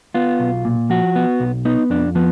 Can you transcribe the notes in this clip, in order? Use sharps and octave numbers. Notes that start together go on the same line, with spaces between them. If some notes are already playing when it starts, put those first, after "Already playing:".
B3 F4
B1
A#2
F3 F#4
B3
B1
B3 D#4
F2 D4
F3 B3